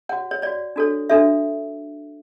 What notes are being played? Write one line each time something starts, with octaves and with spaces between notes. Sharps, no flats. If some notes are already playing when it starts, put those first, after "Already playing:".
F#4 C#5 F#5
C#5
F#4 C#5 D5
D4 F#4 A4 C#5
D4 F#4 A4 C#5 E5